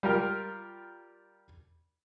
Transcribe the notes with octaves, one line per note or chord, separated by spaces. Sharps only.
G3 F4 A#4 G5